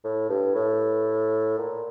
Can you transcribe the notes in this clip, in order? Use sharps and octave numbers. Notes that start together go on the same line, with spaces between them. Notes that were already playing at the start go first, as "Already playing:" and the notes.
A2
G2
A2
A#2